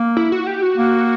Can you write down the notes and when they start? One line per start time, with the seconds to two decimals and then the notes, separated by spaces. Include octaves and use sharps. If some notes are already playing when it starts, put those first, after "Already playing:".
Already playing: A#3
0.17 E4
0.32 F#4
0.47 G4
0.62 F#4
0.78 A#3